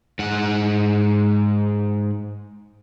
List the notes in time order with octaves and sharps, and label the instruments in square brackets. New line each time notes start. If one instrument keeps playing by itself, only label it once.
[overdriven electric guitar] G#2 F#5